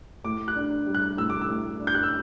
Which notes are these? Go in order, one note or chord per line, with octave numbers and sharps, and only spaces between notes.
A2 D6
F#6
D4
G3
F#6
A2 E6
D6
E6
A2
D4
G6
F#6
E6